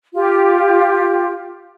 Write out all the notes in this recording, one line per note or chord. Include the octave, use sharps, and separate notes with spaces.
F4 G4